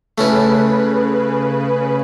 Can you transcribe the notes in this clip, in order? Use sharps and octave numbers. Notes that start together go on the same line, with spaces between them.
C#3 A3 C#4 E4 B4